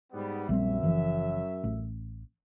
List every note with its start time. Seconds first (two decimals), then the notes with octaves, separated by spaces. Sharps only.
0.12 G#2 G3 B3
0.49 A#1 F#2 G3 C4 E5
0.83 F#1 E3 F3
1.64 A1